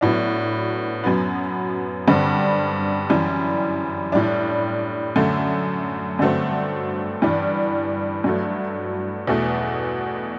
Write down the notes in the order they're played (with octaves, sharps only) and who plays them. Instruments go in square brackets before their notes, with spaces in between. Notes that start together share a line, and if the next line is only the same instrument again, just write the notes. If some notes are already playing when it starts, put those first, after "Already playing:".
[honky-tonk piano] A2 F#3 B3 D4
F#2 F#3 B3
G2 D3 G3 C4
F#2 E3 G3
A2 G3 D4
F#2 D3 A3
G2 D3 F#3 A3 C4
G2 E3 G3 D4
G2 F#3 A3
E2 B2 A3